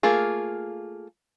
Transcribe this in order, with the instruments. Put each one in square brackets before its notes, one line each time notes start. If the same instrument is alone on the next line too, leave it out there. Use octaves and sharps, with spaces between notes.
[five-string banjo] A3 A#3 F4 G#4